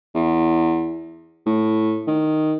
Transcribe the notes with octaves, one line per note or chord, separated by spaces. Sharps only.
E2
A2
D#3